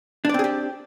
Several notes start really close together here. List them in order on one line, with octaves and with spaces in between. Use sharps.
D4 D5 C4 G#4 G4